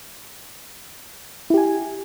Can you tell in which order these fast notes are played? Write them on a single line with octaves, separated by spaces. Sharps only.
E4 G4 G#5